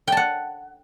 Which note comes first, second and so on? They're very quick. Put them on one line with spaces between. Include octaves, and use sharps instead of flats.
G5 A5 F#5